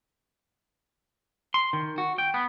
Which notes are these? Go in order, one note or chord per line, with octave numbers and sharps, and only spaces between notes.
C6
D#3
F#4
G5
B3